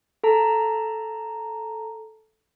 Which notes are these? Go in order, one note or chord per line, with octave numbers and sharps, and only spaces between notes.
A4 A5 A#5